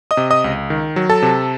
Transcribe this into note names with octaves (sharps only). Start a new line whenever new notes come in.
D#5 D#6
C3
D#5 D#6
C#2
D#3
F#3
A4 A5
C3